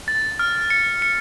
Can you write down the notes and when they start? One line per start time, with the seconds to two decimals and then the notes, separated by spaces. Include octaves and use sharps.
0.08 A6
0.39 F6
0.70 C#7
1.02 C#7